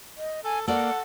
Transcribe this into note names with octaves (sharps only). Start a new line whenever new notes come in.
D#5
A4 G#5
A#3 A4 D5 F#5